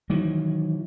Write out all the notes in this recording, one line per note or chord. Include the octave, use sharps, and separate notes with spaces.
D#3 E3 F#3